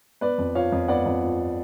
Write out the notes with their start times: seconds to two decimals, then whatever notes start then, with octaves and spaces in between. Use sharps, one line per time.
0.21 B3 B4 D5
0.38 F2
0.55 F3 C#5 F5
0.72 F2
0.88 B3 D5 F#5
1.06 F2
1.23 F3